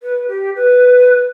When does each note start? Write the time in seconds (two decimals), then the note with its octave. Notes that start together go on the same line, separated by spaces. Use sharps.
0.03 B4
0.28 G4
0.56 B4